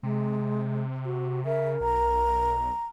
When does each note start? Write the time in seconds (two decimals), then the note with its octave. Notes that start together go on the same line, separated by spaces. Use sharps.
0.03 C3 G#3
1.05 F#4
1.45 C#3 A#4 E5
1.81 B1 A#5